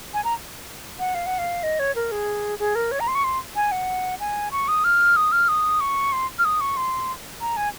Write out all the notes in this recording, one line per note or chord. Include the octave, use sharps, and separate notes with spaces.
G#5
A#5
F#5
F5
F#5
F5
D#5
C#5
A#4
G#4
G#4
A#4
C#5
A#5
C6
C#6
C6
G#5
F#5
G#5
C#6
D#6
F6
D#6
F6
D#6
C#6
C6
F6
D#6
C#6
C6
A#5
G#5